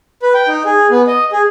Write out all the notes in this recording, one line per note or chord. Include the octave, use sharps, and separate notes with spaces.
B4
G5
D#4
G#4
B3
D#5
G#4